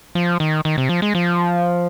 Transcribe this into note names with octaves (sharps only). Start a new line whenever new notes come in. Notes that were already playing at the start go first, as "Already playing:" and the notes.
F3
D#3
D#3
C3
F3
G#3
F3